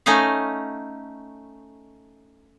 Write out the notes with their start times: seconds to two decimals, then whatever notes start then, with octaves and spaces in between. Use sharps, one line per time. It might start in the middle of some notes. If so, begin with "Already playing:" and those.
0.06 A3 C#4 D#4 D#5 F5